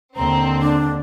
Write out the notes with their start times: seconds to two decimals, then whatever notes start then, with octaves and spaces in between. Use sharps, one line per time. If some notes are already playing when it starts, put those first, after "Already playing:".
0.16 D#2 D3 C4 A#5
0.62 D4 D6